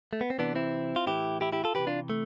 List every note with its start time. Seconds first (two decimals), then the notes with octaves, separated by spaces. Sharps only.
0.13 A3
0.21 B3
0.30 C4
0.39 C3 E3 B3 D4
0.55 C4 E4
0.96 F4
1.06 A2 E3 E4 G4
1.41 E4 G4
1.52 E4 G4
1.64 F4 A4
1.75 C3 E3 G4 B4
1.87 D4 F4
2.10 A3